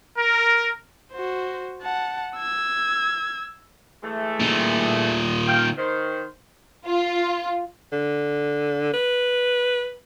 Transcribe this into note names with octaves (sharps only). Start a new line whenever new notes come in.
A#4
F#4 C5
F#5 A5
E6 G#6
E3 G#3 A3
A#2 D#3
F5 G5
D#3 C5
F4
D3
B4